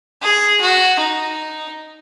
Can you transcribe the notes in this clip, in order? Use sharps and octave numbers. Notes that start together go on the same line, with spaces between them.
G#4
F#4
D#4